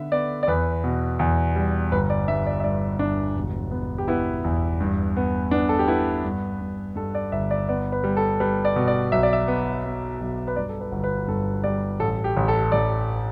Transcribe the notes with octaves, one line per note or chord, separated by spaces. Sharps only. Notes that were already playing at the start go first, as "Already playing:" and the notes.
Already playing: D3 B3 E5
B3 D5
D5
E2 B4
B2
E2
G3
G1 B4
D5
G2 E5
D5
E5
G2 D5
G1 D4
E1
B3
G4
B3 E4
E2
G2
B3
B3 D4
A4
G4
B3 E4
G2
G2
G2 A4
D5
G1 E5
D5
B3 D5
B4
G3
A4
G3 B4
D5
B2
D5
B1 E5
D5
E5
B3
B3
B1
B4
G2 D5
A4
B4
G1
B4
G2 A4
G3 D5
A1 A4
G4
A1
A4
A1 D5